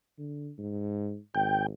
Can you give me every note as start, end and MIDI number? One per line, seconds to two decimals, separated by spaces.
0.18 0.51 50
0.59 1.18 44
1.34 1.71 32
1.34 1.67 79